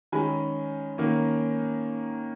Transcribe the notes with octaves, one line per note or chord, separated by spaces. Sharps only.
D#3 G#3 C#4 G#5 B5
D#3 A#3 C#4